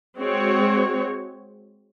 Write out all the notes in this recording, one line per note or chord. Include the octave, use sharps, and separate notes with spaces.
G#3 C4 F#4 C#5